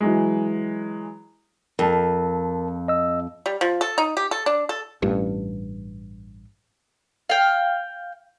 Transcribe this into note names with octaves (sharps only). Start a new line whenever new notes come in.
E3 F#3 G#3
F2 A#4 A5
D#5 E6
G3
F3
A4
D#4
G4
A4
D4
A4
A1 G2
F5 G5